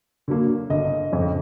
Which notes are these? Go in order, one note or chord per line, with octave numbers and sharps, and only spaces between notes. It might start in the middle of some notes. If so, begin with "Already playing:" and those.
D3 F#3 A#3
G1 D#5
F2 C#3